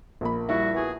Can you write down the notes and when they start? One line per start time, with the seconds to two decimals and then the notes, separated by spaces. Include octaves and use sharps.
0.21 A#1 A#3 B5
0.49 G3 E4 F#4
0.75 B3 F#4 G#4